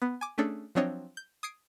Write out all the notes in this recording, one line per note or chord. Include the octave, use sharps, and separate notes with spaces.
B3
G#5 D6
A3 C#4 D4 G#4 A4
F3 F#3 C4 D4 C#5 D#5
G6
D#6 G#6 C7 D7